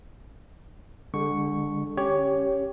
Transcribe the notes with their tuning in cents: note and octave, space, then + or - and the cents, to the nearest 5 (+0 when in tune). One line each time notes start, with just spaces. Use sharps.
D3 +0 G#3 -40 C#6 +0
C#4 +0 G4 +0 C#5 +10